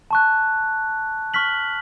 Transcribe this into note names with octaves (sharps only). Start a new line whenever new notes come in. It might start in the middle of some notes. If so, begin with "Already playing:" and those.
A5 C#6 F#6
C#6 F6 B6 F#7